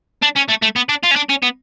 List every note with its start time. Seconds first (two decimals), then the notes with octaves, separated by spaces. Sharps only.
0.23 D4
0.36 C#4
0.49 A3
0.63 A3
0.76 B3
0.89 D4
1.03 F4
1.11 C#4
1.16 D4
1.29 C#4
1.42 B3